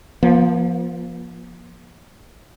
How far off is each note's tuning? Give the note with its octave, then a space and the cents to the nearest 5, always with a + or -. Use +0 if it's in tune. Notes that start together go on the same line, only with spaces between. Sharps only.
F3 +0 A#3 +45